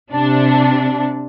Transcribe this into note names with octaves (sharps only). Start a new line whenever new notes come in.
C3 D4